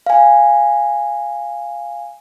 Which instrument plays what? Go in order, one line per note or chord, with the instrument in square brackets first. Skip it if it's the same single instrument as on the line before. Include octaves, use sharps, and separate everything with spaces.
[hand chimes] F5 G#5